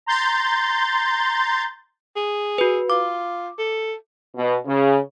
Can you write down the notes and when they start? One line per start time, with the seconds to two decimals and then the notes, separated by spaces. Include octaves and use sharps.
0.06 A#5 C6 G6 A6
2.16 G#4
2.58 F#4 B4
2.90 F4 D6
3.59 A4
4.36 B2
4.66 C#3